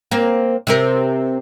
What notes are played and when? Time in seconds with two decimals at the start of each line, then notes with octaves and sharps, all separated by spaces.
0.11 A#3 C4
0.67 C3 C4 A#4